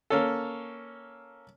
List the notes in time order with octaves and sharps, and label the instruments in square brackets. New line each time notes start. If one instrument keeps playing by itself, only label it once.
[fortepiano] A#3 C#4 A4